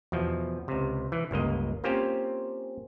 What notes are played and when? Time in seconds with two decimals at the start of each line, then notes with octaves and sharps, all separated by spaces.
0.12 E2 B2 F3
0.68 C#2 C3
1.12 E3
1.31 G1 C#2 A#3 D#5
1.84 A#3 C4 C#4 F4 G4 C5